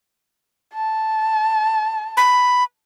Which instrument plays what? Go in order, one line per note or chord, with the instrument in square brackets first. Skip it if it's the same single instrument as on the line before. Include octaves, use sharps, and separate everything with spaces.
[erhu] A5
[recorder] B5